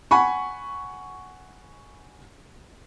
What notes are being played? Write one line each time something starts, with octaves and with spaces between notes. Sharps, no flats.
F#5 G#5 B5 C#6